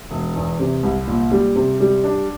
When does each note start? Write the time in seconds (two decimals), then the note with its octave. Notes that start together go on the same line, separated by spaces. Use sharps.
0.11 E1
0.36 E2
0.59 C3
0.83 C2
1.07 A#2
1.32 G3
1.56 C3
1.80 G3
2.04 D4